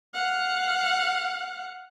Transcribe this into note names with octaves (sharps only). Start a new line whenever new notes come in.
F5 F#5